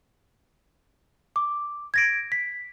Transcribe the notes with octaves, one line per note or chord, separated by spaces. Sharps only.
D6
G#6 A#6 D7
B6